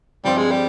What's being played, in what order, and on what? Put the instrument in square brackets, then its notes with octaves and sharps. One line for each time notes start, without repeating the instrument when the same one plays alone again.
[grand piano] G2 F3 C4 F4 [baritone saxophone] G3
[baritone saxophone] G#3
G3